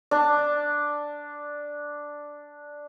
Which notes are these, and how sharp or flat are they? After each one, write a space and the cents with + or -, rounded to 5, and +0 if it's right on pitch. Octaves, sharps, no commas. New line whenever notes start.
D4 +0